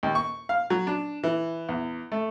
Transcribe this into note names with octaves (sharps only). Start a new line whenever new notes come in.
D#2
C#6
F5
F#3
D4
E3
E2
A3